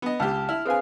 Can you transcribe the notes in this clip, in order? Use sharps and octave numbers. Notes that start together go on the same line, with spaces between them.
B3 D#5
C#2 G4 A5 F6
E4 F6
C4 G#4 B4 F5 G#5